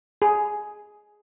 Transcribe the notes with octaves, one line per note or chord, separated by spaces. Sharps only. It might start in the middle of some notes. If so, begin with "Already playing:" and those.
G#4